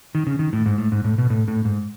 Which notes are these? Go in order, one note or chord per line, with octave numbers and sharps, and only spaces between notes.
D#3
C#3
D#3
A2
G#2
A2
G#2
A2
B2
A2
A2
G#2